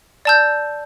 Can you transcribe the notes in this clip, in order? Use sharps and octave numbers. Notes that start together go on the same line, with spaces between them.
D5 A5 E6 G6